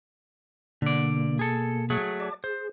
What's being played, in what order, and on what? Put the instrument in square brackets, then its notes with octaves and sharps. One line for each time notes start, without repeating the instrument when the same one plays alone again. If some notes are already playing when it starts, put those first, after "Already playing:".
[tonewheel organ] B2 A#3 [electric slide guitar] D3 D5
[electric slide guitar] G#4 A4
F#3 A3 G#4
[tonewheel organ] D5 A5 D6
[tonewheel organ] G#4 [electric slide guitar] C5